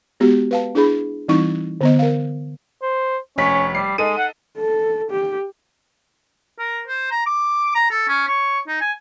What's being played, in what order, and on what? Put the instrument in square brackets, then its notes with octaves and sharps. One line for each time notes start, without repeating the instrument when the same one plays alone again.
[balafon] G#3 B3 F#4 G4
B4 F5 A5
D4 E4 G#4 B5
E3 G3 C4 D#4 E4 C#6
D3 B3 D#5
A#4 F5
[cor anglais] C5
[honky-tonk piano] F1 C#5 B6 [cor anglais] C#4
[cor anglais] G3 [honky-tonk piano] C7
[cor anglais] G#3 [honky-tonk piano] D#4 A4 D#7
[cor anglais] F#5
[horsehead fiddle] A4
G4
[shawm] A#4
C5
A#5
D6
A#5
A4
C#4
C#5
D#4
G#5